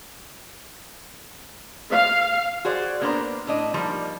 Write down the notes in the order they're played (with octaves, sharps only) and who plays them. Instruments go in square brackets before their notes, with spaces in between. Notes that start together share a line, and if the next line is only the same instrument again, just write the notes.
[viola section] F5
[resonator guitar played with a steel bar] F#4 G#4 C5 D5
A#3 B3 D4 A#4 C5 A#5
A2 D4 D#5
F3 G3 A#3 D#4